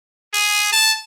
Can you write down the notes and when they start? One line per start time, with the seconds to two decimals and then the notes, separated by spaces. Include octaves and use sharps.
0.33 G#4
0.72 A5